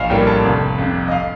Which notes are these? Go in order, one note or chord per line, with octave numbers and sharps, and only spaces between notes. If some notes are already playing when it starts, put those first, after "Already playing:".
Already playing: A#1 D#5 F5
A2 G3 A#3 G5
A5
F1
F2 C3
D#5
F5